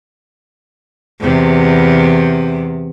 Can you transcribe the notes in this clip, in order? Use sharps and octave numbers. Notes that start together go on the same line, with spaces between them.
E2 C3